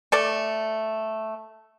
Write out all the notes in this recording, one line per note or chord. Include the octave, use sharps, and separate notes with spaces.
A3 A4 D5